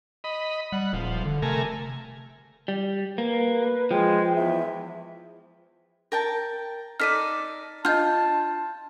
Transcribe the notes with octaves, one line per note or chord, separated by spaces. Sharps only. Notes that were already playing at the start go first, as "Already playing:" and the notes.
D#5 B5
G3 F#5
D#1 F3
D3
C3 A3 A#4 G#5
G3
A#3 B4
F3 G#3 G5
E2 E5
A#4 G5 A5
D#4 A4 D5 F6 B6 D#7
D4 F4 D#5 A5 F6 G6